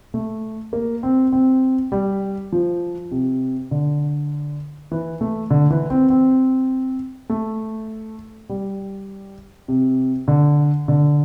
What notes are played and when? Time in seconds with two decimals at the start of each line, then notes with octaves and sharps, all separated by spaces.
0.14 A3
0.73 A#3
1.03 C4
1.33 C4
1.92 G3
2.52 F3
3.11 C3
3.71 D3
4.91 E3
5.21 A3
5.51 D3
5.70 E3
5.90 C4
6.10 C4
7.30 A3
8.49 G3
9.68 C3
10.28 D3
10.88 D3